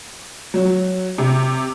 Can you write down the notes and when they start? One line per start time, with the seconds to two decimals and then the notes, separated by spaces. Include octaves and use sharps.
0.54 F#3
1.18 C3